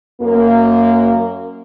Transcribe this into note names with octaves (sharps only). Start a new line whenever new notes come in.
F#2 A#3